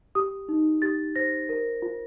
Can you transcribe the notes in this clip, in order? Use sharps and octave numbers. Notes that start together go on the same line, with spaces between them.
G4 D#6
D#4
G4 A6
C5 A#6
A#4
F4